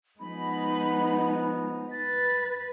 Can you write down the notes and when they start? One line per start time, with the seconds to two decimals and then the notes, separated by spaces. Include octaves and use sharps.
0.20 F3 G#3 B3 D#4 B5
1.92 B4 A6